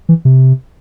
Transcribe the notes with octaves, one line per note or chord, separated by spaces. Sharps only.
E3
C3